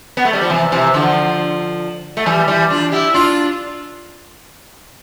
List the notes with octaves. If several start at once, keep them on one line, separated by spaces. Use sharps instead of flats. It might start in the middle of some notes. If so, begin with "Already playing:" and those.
B3
A3
G3
F3
C3 E3
C3 E3
D3 F3
A3
E3 G3
E3 G3
D4 F4
E4 G4
D4 F4